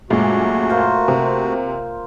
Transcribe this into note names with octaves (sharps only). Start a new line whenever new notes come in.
F#2 A#2 G#3 A3 F#4
A#3 F4 C5
C3